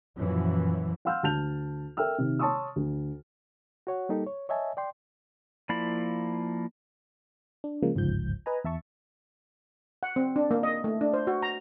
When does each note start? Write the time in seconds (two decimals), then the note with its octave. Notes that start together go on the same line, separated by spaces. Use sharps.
0.17 F#2 A#2 E3 F3
1.05 F5 F#5 C6 E6 F6 G6
1.23 D2 A5 G6 F7
1.97 A4 A#4 E5 G5 E6 F6
2.18 C3 D#3
2.39 C#5 A5 C6 C#6 D#6 E6
2.76 D2
3.87 F#4 C#5 F#5
4.09 G3 A#3 D#4 G4 A4
4.27 C#5
4.49 C#5 D#5 E5 G#5 A5
4.77 D5 G5 C6
5.69 F3 A#3 E4 D5 B5
7.64 D4
7.83 C#3 F3 G#3 A#3
7.95 G1 C#2 G#2 F3 G6
8.46 B4 D#5 G#5 A#5
8.65 E2 E5 A5 C#6
10.03 F#5
10.16 C4
10.36 D4
10.51 A#3
10.63 D#5
10.84 A3
11.01 D4
11.13 C5
11.27 F#4
11.43 A#5